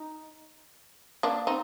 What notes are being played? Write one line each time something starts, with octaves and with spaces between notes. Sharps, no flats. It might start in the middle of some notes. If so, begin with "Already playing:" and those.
Already playing: D#4
A#3 D4
C4 D#4